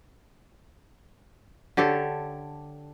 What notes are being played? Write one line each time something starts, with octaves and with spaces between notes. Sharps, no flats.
D3 G4 A4 C#5